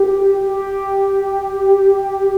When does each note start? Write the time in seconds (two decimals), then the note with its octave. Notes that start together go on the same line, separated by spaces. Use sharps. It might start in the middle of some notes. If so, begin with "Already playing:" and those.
Already playing: G4
0.47 G4